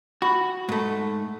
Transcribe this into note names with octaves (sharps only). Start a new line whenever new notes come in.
F#4 B5
G#2 A3